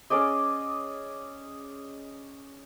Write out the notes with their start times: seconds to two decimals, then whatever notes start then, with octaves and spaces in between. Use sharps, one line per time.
0.10 C#4 G#4 D5 D#5